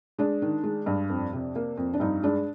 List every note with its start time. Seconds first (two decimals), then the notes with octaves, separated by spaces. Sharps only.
0.18 G#3 D4
0.42 D#3
0.64 G#3
0.86 G2
1.09 F2
1.33 C3
1.56 A#3
1.77 F2
1.94 D4
2.00 G2 D#4
2.23 G#3 D4